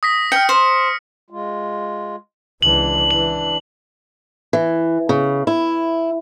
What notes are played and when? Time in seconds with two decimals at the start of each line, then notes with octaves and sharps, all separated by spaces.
0.03 D#6 A#6 B6
0.32 G5 F6 C#7
0.49 C5
1.30 G#3 F4
2.62 C#2 E3 D4 F#7
3.11 E3 F#7
4.53 E3
5.09 C#3
5.47 E4